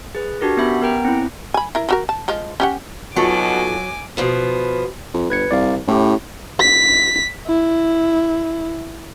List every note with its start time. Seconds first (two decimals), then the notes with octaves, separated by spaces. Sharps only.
0.15 G#4 B4
0.41 D4 F#4 G4 A#4 A#6
0.57 B3 C#4 G4 E5 B5
0.81 B3 A#4 G5 A#5
1.05 C4 C#4 E4
1.54 G#5 B5
1.75 E4 A#4
1.89 F3 F#4 A#4
2.09 A5
2.28 F3 G#3 F4
2.60 C#4 G4 F#5
3.16 B2 F#3 D#4 F4 A4 G#5 D6
4.17 B2 F3 B3
5.14 F2
5.30 G1 B4 G#6 C#7
5.51 C2 D5 F5
5.88 A2 C#4 E4 G4
6.60 B6
7.47 E4